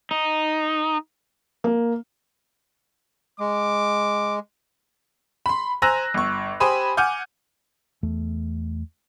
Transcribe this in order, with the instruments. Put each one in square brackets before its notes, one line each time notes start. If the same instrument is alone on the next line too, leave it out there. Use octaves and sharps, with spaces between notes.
[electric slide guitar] D#4
[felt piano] A#3
[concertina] G#3 [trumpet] D6
[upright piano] B5 C6
C5 G#5 A#5 E6 F#6 A#6
G1 C#6
G4 C5 G#5 B5 D#6
F#5 G#5 D6 F6 G6
[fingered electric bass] E2 A3